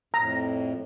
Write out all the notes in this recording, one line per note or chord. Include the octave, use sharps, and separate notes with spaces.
F2 A2 A#5